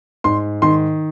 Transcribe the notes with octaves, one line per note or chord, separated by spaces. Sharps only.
G#2 C6
D#3 C6